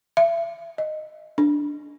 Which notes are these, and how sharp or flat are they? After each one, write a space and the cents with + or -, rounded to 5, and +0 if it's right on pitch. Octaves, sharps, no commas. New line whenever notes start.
E5 +30
D#5 -10
D4 +0